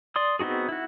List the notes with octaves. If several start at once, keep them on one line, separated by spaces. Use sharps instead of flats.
D5 C6 D#6
B3 C4 D#4 F#4 G#4
E4 F#4